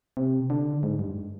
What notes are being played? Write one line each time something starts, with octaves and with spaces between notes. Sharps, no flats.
C3
D3
G#2
G2